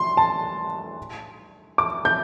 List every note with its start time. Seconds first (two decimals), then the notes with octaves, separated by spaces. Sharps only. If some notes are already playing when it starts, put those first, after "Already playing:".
Already playing: C6
0.17 A5
1.78 D6
2.05 G6